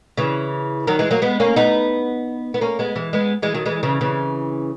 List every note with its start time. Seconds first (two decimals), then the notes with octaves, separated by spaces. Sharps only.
0.17 C#3 E3
0.87 D#3 F#3
0.99 E3 G#3
1.11 F#3 A#3
1.22 G#3 B3
1.40 A#3 C#4
1.56 B3 D#4
2.54 B3
2.61 A#3 C#4
2.79 G#3 B3
2.96 E3 G#3
3.13 G#3 B3
3.42 E3 G#3
3.54 D#3 F#3
3.66 E3 G#3
3.83 C#3 E3
4.01 C#3 E3